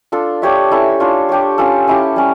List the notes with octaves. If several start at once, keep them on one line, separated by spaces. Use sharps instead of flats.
D4 F4 A4
D4 G4 C#5 E5
C#4 E4 A4
D4 F4 C#5
D4 G4 C#5
C#4 F4 A4
C#4 E4 G4
G3 C#4